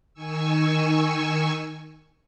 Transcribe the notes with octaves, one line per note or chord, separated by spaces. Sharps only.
D#3 G#5 C#6 E6